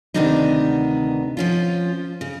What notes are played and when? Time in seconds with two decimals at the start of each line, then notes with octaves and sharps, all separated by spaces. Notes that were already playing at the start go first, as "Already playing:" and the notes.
0.14 D2 C3 D#3 B3 D4 D#4
1.37 F3 C#4 F4
2.21 C#3